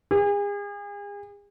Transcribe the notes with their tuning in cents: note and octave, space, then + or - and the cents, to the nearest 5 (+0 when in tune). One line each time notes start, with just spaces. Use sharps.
G#4 -40